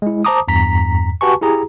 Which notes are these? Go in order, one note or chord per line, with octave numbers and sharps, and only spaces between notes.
G#3 E4
C5 A5 A#5 D6 D#6
E2 G2 A#5 B6
F#4 G4 B4 G#5 A5 C#6
E4 G4 G#4 A#5